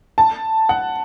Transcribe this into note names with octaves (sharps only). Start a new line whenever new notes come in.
A5
F#5